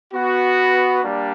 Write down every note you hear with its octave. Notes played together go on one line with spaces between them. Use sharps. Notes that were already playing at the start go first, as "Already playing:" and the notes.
B3 F#4
G3 A#3 D4